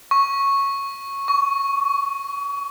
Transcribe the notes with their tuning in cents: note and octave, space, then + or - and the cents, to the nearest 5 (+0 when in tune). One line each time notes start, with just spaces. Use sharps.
C#6 -5
C#6 +30